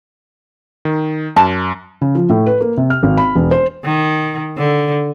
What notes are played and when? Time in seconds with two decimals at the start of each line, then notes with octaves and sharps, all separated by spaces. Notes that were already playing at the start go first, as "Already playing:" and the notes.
0.85 D#3
1.36 F#2 A5
2.01 C#3
2.15 F3
2.29 A2
2.46 B4
2.61 A#3
2.77 C3
2.90 F6
3.03 G#1
3.18 B5
3.36 E1
3.51 C5
3.84 D#3
4.58 D3